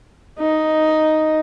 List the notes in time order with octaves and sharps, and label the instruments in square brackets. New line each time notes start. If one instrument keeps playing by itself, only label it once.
[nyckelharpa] D#4